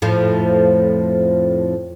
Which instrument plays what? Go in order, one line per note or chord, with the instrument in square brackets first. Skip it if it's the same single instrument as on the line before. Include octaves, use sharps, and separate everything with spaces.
[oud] F2 A2 F3